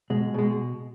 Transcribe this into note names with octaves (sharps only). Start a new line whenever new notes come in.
B2 G#3
B2 G#3